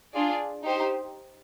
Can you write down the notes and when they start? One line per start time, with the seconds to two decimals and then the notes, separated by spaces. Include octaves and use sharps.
0.13 D4 F4 G#4 D5
0.63 D#4 G4 C5